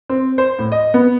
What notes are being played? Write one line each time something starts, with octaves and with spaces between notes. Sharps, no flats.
C4
C5
A2
D#5
B3